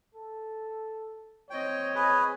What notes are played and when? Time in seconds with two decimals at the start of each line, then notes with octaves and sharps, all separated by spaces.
0.15 A4
1.50 C4 C#5 D#5 G5
1.95 G#4 B4